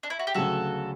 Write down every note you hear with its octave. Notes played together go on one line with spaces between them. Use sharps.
D4
E4
F#4
G4
D2 C#3 F#3 F#4 A4